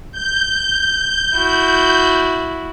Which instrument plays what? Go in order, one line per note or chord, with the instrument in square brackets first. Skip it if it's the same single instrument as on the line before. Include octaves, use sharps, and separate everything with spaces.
[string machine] G6
[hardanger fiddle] E4 F#4